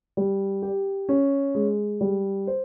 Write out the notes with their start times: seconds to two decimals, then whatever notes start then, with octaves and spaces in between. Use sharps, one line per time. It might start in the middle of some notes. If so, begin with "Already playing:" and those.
0.17 G3
0.62 G4
1.09 C#4
1.55 G#3
2.01 G3
2.47 C5